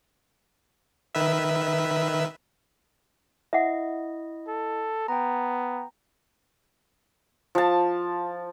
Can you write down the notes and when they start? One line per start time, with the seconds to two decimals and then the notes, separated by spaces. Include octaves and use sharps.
1.15 D#3 B4 E5
3.53 E4 D#5 E5 F#5
4.48 A4
5.08 B3 G5 A#5
7.55 F3 A5